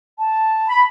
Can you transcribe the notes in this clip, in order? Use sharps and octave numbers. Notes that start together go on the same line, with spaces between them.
A5
B5